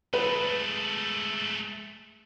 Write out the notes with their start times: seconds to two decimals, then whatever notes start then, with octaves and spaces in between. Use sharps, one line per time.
0.13 G#3 A3 B4